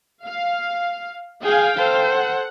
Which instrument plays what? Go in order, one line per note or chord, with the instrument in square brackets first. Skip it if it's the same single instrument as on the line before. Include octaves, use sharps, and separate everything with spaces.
[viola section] F5
[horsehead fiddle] G#4 G#5 [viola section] F5 G5
[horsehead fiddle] A4 C5
[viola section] F#5